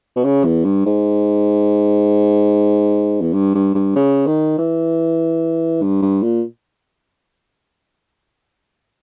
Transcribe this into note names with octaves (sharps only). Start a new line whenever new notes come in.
B2
C#3
E2
G2
G#2
E2
G2
G2
G2
C#3
D#3
E3
G2
G2
A#2